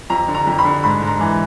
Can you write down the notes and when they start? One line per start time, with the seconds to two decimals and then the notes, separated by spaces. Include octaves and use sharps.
0.10 F2 A#5
0.28 D3
0.34 A#5
0.47 F2
0.58 B5
0.65 D3
0.83 G#2 B5
1.02 G#2
1.07 A#5
1.21 E3